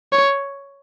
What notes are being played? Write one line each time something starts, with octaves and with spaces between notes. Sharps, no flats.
C#5